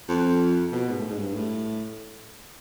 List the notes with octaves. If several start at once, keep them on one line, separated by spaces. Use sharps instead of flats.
F2
B2
G#2
A2
G#2
G2
A2